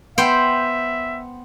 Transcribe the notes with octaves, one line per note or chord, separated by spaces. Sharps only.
B3 C5 E5 G5